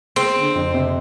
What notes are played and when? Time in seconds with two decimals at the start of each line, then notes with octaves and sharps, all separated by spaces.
0.16 G#3 C4
0.36 D3
0.55 F2
0.74 C3